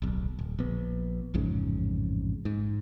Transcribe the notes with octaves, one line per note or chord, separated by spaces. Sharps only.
D1 B1
D1
A#1 B3
A1 F2 G#2 C#3
G#2